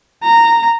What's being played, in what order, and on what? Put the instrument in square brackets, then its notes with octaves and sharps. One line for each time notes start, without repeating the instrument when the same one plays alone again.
[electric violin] A#5